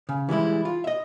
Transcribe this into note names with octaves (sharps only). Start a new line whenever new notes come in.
C#3
E3 G3 G#3 E4
F4
D#5 E5